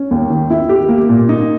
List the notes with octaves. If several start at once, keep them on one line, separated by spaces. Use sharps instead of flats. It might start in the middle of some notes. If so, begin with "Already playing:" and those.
Already playing: C#4
D#2
D#3
E4
G4
A#3
A#2
D#4